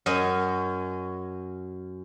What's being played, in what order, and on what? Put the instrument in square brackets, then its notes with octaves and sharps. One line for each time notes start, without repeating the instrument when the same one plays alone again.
[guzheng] F#2 C#4 D#5